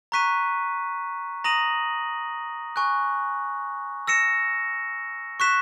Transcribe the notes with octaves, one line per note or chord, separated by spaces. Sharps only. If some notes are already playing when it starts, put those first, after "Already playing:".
A#5 C#6 F#6 B6 D#7
A#5 D#6 A#6 D#7 F#7
G#5 C#6 F#6
E6 A#6 C#7 E7
C#6 F#6 B6 E7